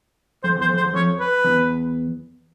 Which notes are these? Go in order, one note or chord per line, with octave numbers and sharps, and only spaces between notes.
F2 C5
E2
C5
F2
C5
E2
F2 C#5
B4
E2